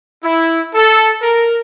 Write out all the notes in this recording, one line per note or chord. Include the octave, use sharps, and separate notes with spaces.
E4
A4
A#4